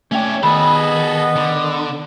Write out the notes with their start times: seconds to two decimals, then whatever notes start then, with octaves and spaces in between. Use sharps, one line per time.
0.12 A3 C#4 D4 E5 G5
0.43 D#3 B3 G#4 A4 D#5 B5
1.36 D3